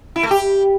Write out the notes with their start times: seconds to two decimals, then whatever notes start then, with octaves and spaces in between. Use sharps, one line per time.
0.16 E4
0.23 A3
0.31 G4